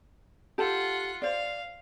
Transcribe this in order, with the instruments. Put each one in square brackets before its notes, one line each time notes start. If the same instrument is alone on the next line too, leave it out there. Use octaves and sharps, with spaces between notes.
[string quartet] F4 F#5 [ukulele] G4 A4 A5
[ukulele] C5 D5 [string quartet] F5